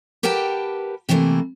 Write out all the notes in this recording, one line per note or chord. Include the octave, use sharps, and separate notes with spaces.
G4 A#4 B4 F#5 G5 A5
C3 E3 A3 A#3 E4